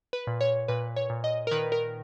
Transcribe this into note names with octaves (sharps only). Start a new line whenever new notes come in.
B4
A#2
C#5
A#2 B4
C#5
A#2
D#5
A#4
D#3 B4
A#4